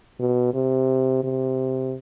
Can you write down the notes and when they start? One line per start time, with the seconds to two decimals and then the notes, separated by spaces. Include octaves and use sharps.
0.20 B2
0.54 C3
1.24 C3